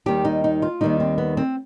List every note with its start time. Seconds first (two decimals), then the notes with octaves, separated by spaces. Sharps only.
0.06 D#2 D#3 G3 G4
0.25 D#4
0.44 D#4
0.62 F4
0.81 D#2 D#3 G3 D#4
1.00 C4
1.18 B3
1.37 C4